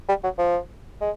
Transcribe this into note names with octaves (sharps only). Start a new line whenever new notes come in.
G3
F#3
F3
G#3